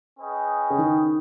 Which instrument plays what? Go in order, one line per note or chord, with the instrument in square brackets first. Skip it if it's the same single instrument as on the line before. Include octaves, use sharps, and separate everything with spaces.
[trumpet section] C#4 G#4 B4 D#5 G5
[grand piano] C#3
D#3